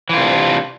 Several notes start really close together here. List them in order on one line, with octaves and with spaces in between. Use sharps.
E3 F4 C3 D4